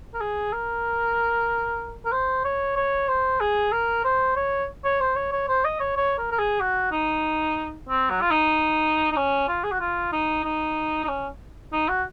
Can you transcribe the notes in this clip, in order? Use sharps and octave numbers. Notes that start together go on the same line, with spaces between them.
A#4
G#4
A#4
A#4
C5
C#5
C#5
C5
G#4
A#4
C5
C#5
C#5
C5
C#5
C#5
C5
D#5
C#5
C#5
A#4
A#4
G#4
F#4
D#4
C4
F#3
F4
D#4
D#4
C#4
F4
G#4
F#4
F4
D#4
D#4
D#4
C#4
D#4
F#4